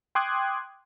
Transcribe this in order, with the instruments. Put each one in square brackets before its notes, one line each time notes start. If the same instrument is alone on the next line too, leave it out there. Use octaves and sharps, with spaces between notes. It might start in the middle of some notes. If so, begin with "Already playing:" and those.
[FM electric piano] G5 C6 D6 D#6 F#6 G#6